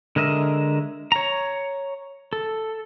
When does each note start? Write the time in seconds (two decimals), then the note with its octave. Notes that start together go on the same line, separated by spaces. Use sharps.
0.16 D3 G#3 A#4 D#5 E5
1.12 C#5 A#5
2.33 A4